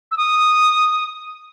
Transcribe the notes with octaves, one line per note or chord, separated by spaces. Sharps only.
E6
D#6